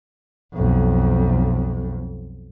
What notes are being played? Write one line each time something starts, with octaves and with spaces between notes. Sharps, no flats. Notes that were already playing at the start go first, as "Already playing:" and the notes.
B1 F2